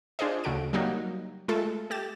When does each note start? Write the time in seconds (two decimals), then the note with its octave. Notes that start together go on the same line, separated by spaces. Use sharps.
0.19 D4 F4 G#4 C5 D#5
0.44 D2 C#3 F#4 A4 D7
0.73 F#3 G3 A#3 D#4 F#4
1.48 G#3 A3 F4 A4
1.90 A3 G4 A6 E7